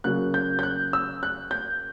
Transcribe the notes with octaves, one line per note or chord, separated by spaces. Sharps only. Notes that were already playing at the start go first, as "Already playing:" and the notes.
C#3 F#3 A#3 F#6
G6
G6
F#6
E6
F#6
G6